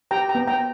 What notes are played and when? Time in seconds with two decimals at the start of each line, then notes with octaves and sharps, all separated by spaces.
0.11 G4 G5 A#5
0.29 G5 A#5
0.35 B3
0.47 G5 A#5